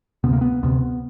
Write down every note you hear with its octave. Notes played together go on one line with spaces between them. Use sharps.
D2 C3 B3
A#3
B3
D2 C3 B3